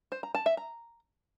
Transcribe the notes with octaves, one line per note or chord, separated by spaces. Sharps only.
C5
A#5
A5
E5
A#5